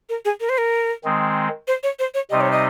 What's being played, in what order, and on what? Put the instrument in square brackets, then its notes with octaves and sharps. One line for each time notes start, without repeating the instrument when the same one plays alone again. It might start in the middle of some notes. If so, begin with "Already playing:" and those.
[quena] A#4
G#4
A#4
C5
A#4
[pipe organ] D#3 G#3 C4
[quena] C5
C#5
C5
C#5
[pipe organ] C3 G3 C4 D#4 [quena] D#5
[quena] C#5
D#5